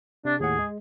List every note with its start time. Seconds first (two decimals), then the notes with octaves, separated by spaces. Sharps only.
0.25 C3 D4
0.40 D#2 A2 G#4 F#5
0.59 G#3